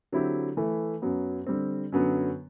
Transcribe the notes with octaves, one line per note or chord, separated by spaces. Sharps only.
D3 F#3 C4 E4 G4
E3 A3 E4
F#2 F#3 B3
D3 G3 C4
F#2 D3 F#3 B3